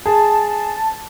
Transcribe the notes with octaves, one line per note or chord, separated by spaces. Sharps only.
G#4 A5